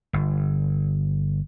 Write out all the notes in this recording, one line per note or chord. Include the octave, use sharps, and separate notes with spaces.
G1